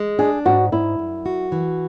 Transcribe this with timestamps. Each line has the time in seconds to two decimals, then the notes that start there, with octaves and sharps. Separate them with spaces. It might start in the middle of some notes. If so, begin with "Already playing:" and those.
Already playing: G#3
0.19 D4 G#4
0.46 G#2 F#4
0.72 G#2 E4
0.99 F#2
1.26 F#4
1.52 E3